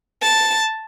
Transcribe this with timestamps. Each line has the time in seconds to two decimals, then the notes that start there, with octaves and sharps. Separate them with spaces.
0.22 A5